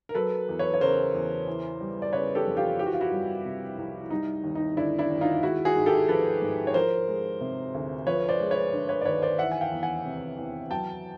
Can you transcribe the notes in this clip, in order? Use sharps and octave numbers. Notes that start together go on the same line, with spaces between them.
A#4
F#3 A4 B4
E2
B4 C#5
C#5
C#3 A#4 C5
E2
E3
G3
D5
C#3 B4 C#5
G4 A4
F2
F4 G4
E3 G4
F#4
F4
E4 F#4
G3
C3
C2
G3 D#4
D#2
D#4
D3 D4 E4
D4 E4
D#2
D#4 F4
G#3 E4 F#4
F#4 G#4
G#2
G4 A4
F3 A4 B4
G#2
C#5
F3 A#4 C5
G#3
C3
D2
F3 B4 C#5
C5 D5
G#3
B4 C#5
D3
B4 C#5
D5
D#2 B4 C#5
C5 D5
E3 E5 F#5
G#5
F5 G5
E2
F#5 G#5
C3
E2
F#3 G5 A5